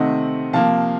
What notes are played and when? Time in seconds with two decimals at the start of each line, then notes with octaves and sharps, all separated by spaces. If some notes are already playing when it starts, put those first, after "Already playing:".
Already playing: C3 D#3 A3 C4 D#5 F#5
0.53 C3 F3 A#3 F5 A5